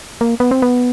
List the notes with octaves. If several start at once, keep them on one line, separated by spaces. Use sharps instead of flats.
A#3
B3
C4
B3